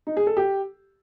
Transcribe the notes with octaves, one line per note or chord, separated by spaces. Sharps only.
D#4
G#4
A4
G4